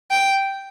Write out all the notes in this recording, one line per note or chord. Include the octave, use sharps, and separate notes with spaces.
G5